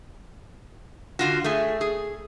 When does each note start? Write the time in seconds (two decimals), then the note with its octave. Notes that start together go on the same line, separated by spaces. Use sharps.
1.19 D3 F4 F#4
1.44 A3 G#4
1.81 G#4